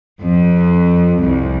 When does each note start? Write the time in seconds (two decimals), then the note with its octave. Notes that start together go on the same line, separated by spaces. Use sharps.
0.21 F2
1.22 C2